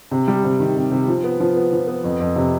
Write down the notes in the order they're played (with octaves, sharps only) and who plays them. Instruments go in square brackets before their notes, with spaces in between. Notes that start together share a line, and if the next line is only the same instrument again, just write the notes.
[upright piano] C3
G3
C3
D#3
C3
C3
F3
B3
F3
B3
F3
B3
F2
F2
C3